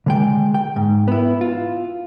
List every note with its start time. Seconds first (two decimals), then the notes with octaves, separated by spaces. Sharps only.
0.06 D3 G#3 G5
0.54 G5
0.76 G#2
1.08 B3 E4
1.41 F4